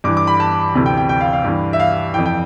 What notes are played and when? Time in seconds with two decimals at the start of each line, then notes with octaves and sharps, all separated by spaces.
0.04 G2 E3 D6
0.17 D6
0.27 B5
0.40 A5
0.75 D2 C3 E3
0.86 G5
0.97 G5
1.09 G5
1.21 F5
1.33 F5
1.44 G2 E3
1.73 E5
1.80 F5
2.14 F2 E3 G5
2.26 G5